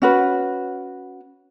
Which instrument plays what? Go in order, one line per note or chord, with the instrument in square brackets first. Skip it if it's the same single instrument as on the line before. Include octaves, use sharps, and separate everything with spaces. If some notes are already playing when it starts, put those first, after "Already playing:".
[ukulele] C#4 F#4 B4